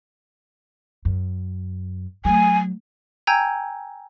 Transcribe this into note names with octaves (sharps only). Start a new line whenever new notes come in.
F#2
F#3 A3 G#5
G5 G#5 A#5 E6 G6 G#6